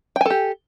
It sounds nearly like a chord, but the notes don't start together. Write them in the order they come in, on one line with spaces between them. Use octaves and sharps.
G5 G#5 A4 G4